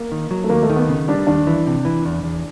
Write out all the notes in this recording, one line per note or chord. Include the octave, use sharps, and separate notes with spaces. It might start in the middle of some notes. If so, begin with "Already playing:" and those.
Already playing: A#3
D#3
F#3
A3
D#2 A#3
A3
D#3
B3
C#3
G3 D4
D#2 D4
E3
C3
E3
E2
E2